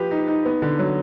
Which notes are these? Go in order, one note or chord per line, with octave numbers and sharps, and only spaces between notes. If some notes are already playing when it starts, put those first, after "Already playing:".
Already playing: F3 G4 B4
D#4
D#4
B3
D3
F#3